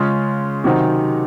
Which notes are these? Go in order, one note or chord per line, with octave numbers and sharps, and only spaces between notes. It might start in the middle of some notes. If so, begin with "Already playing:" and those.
Already playing: C#3 G#3 C#4 F4
C3 D#3 F#3 C4 D#4